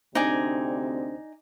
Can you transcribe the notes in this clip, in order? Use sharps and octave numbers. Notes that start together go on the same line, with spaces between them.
D2 C3 C4 D4 D#4 C5 D5 G#5